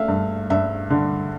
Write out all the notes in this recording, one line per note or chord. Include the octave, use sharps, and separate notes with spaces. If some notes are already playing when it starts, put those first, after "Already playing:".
Already playing: A3 E5 F5
G2
G2 E5
D3